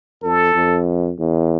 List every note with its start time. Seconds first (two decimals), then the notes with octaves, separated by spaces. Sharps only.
0.23 F2 A4
0.54 F2
1.19 E2